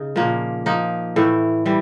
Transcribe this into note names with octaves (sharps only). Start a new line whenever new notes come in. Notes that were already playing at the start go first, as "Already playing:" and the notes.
Already playing: C#3 D#4
A#2 F3 A#3
F3 A#3 D#4
A2 E3 A3
E3 G3